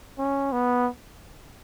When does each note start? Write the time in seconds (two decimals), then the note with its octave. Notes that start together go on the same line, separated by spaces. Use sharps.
0.18 C#4
0.52 B3